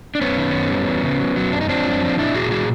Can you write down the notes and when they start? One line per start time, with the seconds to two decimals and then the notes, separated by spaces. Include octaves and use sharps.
0.15 D4
0.21 F#2 B3 C#4
0.37 D#3
0.54 F#2
0.71 G3
0.87 E2
1.03 C#3
1.20 F#3
1.36 F#3
1.53 F#2 D4
1.61 D#4
1.69 F3 C4 D4
1.85 F#2
2.02 F3
2.18 A#2 D4 E4
2.35 A#2 F#4 G#4
2.51 G3 F#4 G#4